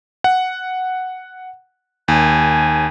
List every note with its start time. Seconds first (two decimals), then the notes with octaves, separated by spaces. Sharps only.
0.24 F#5
2.08 D#2 G#5